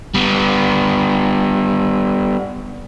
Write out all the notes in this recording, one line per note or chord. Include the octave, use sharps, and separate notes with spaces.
G3 B3